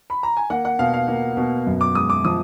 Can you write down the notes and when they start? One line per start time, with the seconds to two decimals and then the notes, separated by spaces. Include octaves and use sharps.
0.10 B5
0.23 A#5
0.37 G#5
0.50 A#3 F#5
0.65 F#5
0.79 B2 F5
0.94 F5
1.08 A#3
1.37 B2
1.66 F#2
1.81 D6
1.95 G#3 D#6
2.10 D6
2.25 F3 D#6